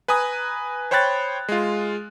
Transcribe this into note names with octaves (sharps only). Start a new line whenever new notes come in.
B4 G#5 A#5 D#6
C5 C#5 G5 B5 F#6 A6
G#3 F4